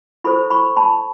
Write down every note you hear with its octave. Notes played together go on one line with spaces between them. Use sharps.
E4 A4 C5 B5 C#6
B5 C#6
A5 B5